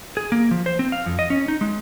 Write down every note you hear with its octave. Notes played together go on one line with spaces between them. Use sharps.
G#4
A#3
F3
C5
C4
F5
F2
D#5
C#4
D#4
G#3